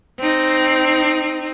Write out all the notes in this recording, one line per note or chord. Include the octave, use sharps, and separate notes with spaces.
C4 D#4